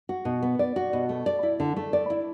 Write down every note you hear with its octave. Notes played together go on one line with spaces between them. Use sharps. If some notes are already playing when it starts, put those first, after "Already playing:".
F#4
B2
B3
D5
F#4
B2
A3
D5
E4
D3
A3
D5
E4